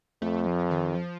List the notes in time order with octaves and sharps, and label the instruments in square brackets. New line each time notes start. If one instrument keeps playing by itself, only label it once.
[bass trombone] F2 [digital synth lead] A3
[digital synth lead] F3
D#3
F3